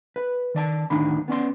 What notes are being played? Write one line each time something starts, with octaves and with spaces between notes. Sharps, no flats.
B4
D#3 D5 A5
D2 A2 D3 D#3 D4 B5
B3 C#4 D5 C6